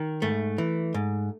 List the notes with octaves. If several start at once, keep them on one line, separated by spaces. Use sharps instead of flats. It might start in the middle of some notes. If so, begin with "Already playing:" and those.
Already playing: D#3
G#2 A3
E3
G#2